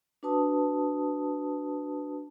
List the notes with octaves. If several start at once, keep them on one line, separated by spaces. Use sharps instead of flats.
D4 F#4 B4 A5 D#6